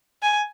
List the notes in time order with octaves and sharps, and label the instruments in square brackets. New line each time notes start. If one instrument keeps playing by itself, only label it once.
[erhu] G#5